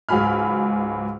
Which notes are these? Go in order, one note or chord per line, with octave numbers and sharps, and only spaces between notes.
C#2 G#2 F#3 G#4 B5 F6